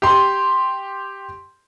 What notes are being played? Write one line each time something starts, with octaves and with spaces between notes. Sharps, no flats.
G4 C6